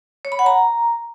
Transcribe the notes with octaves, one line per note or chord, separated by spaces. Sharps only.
C#5
B5
F#5
A#5